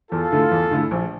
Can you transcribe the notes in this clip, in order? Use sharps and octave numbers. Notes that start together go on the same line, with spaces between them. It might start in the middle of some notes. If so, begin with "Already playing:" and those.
E2 F4 A4
D3 A3 E4
E2
D3 A3 E4
A#1